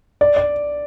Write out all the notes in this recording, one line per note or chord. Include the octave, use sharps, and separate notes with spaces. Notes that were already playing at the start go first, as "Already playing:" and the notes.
D5
D5